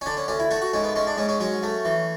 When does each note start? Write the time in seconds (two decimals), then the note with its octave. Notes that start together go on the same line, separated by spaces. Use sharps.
0.01 C#4
0.06 D3 D4
0.17 C#4
0.28 D2 C#4
0.39 E4
0.51 A3 F#4
0.62 F#4
0.73 G#2 C#4
0.84 B3
0.96 G#3 C#4
1.07 D4
1.17 G#2 C#4
1.29 C#4
1.40 F#3 C#4
1.63 A3
1.85 E3